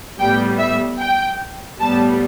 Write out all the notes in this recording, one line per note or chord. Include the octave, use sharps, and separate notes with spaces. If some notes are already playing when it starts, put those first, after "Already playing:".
A2 G3 B3 G5
E5
G5
A2 G3 B3 A5